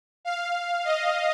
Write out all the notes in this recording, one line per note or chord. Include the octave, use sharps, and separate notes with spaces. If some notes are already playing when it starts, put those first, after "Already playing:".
F5
D#5